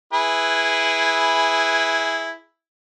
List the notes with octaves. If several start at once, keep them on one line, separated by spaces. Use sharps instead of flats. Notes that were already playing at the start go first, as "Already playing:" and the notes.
E4 G#4 B4